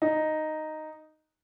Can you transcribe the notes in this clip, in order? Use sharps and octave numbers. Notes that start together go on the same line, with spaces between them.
D#4